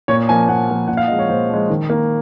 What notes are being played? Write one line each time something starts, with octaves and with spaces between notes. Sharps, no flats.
A#2 C#5
F3 A#3 G#5
A#2 F#5
F3 A#3
A#2 F#5
F5
F3 G#3 D#5
C#5
A#2 C5
F3 G#3
D#3
A#3